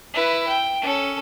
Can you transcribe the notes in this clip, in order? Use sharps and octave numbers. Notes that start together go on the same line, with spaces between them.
E4 B4
G5
C#4 A4